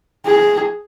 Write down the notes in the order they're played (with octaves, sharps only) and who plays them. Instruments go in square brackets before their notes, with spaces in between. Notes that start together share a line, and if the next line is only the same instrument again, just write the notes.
[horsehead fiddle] G#4